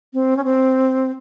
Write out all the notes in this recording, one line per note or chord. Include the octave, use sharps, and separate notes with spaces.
C4
C#4
C4